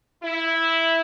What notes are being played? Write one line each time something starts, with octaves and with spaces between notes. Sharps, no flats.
E4